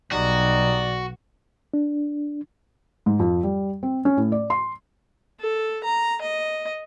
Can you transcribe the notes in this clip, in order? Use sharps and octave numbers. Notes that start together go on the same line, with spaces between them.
B1 G3 D#4 F#4 D5
D4
G#2
F2
G3
C4
C#4
A2
D5
C6
A4
A#5
D#5